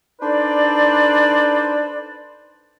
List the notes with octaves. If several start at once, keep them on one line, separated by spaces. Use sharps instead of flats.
D4 D#4 A4 B4 C5 D5